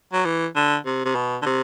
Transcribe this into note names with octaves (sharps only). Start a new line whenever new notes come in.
F#3
E3
D3
C3
C3
B2
D3
C3